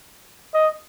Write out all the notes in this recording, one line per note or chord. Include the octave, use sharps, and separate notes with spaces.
D#5